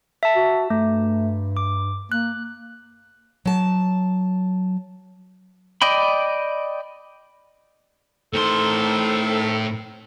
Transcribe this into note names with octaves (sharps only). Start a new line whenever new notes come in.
E5 A5
F#4
G2 A3
D6
A#3 F#6
F#3 A5
D5 D#5 G5 B5
A2 D#3 C4 A4 C6